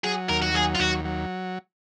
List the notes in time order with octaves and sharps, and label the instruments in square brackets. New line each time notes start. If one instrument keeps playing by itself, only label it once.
[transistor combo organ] F#3 [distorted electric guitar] G#4
[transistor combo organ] D#2 [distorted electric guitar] A#4
[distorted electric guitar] F#4
[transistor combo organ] F#3 [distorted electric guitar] G#4
[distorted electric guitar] F4
[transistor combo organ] D#2 [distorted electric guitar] F#4
[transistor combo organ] F#3